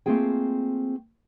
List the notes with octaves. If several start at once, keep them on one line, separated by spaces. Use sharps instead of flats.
A3 A#3 C4 F4 G#4 G5